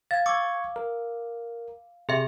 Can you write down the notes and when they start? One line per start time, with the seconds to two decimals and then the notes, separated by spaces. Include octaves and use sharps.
0.11 F5 G#6 A6
0.26 C#6 D6 E6 G#6
0.76 A#4
2.09 C3 G#4 E5